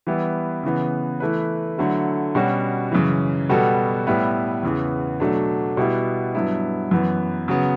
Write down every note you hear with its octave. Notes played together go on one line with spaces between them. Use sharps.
E3 G3 B3 E4
C#3 E3 B3
E3 A3 E4 B4
D3 F#3 A3 E4
B2 G3 C#4 F#4
F#2 C#3 E3
B2 G3 B3 F#4 A4
A2 G3 B3 E4 B4
E2 C#3 E3 B3
B2 F#3 A3 D4
B2 G3 B3 E4 G4
G2 F#3 B3 E4
F#2 E3 B3
C#3 F#3 B3